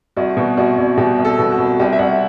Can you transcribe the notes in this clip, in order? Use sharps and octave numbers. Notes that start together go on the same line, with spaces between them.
C2 F#4
B2
C2 F#4
C2
B2 G4
C2
A4
B2
F#4
C2
C2 G4
E5
C2 F#5